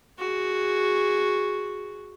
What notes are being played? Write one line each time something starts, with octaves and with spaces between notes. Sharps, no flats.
F#4 G#4